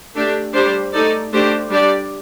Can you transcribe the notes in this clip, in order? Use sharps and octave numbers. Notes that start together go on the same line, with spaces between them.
A3 D4 G4
G3 D4 G4 C5
A3 D#4 A4 D5
A3 D4 G4 C5
G3 D4 G4 D5